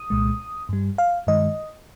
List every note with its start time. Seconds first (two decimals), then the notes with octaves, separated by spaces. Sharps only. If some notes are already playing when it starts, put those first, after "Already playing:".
Already playing: D#6
0.10 C2 A#2 G#3
0.69 G2 G3
0.98 F5
1.27 G2 D#3 G#3 D#5